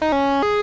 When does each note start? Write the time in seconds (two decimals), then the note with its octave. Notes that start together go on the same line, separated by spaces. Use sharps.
0.02 D#4
0.12 C#4
0.43 G#4